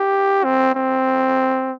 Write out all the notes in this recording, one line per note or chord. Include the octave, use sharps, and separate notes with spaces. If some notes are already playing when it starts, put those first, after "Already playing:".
Already playing: G4
C4
C4